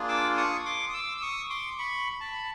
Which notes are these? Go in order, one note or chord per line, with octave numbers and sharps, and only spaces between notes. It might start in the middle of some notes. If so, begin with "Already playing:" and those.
Already playing: A#3 D4 F4 G#4
D6 E6
C#6 D#6
C6 D6
D#6
D6 E6
E6
C#6 D#6
C6 D6
B5 C#6
A5 B5